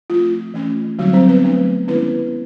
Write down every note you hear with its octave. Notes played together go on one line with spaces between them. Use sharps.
F3 A3 C4 F4
E3 A3 C#4
D3 F#3 G3 C4 D#4 F#4
C4 C5
B3 B4
F#3 A3 D4
D#3 G#3 B3 C#4 E4 B4